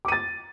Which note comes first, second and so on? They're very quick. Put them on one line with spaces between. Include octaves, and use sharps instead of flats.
D6 D#7 A6